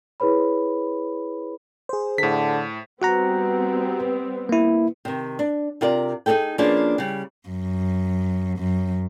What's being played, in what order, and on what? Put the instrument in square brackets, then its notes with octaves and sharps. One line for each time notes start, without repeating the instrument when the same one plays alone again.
[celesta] E4 G#4 B4 C#5 B5
[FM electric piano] G#4 C5
[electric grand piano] A2 B6 [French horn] D3
[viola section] G3 B3 C4 [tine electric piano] F#4 F#5 A#5
[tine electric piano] A#3 E4
[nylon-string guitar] C3 D#3
D4
C3 F4 A#4 D5
D#4 E4 G#4 A4 G5
F3 A#3 B3 C#4 D4 G#4
C#3 G3
[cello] F#2
F#2